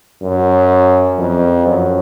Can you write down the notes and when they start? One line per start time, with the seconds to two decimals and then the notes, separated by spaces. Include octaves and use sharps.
0.22 F#2
1.18 F2
1.67 F#2